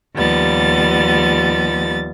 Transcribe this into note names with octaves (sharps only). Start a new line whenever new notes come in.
D#2 F3 G3 B3 A6